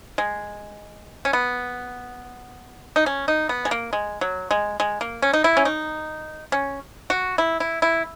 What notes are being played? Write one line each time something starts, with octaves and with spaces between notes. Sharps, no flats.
G#3
C#4
B3
D#4
C#4
D#4
B3
G#3
A#3
G#3
F#3
G#3
G#3
A#3
C#4
D#4
E4
C#4
D#4
C#4
F#4
E4
E4
E4